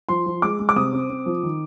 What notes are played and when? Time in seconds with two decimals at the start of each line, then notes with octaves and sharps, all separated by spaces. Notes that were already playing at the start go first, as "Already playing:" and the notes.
0.09 F3 C6
0.26 F3
0.42 G#3 D6
0.59 G#3
0.69 D6
0.76 C3 D#6
0.93 C4
1.10 C4
1.26 F3
1.43 D#3